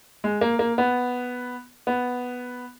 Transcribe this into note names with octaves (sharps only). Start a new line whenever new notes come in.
G#3
A#3
A#3
B3
B3